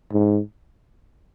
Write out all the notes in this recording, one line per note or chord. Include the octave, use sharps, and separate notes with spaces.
G#2